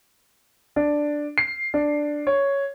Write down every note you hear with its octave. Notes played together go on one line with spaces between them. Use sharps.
D4
C7
D4
C#5